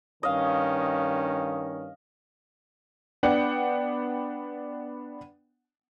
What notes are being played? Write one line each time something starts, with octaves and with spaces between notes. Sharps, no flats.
G2 D#3 C#4 D#5 F5
B3 D4 F#5 G5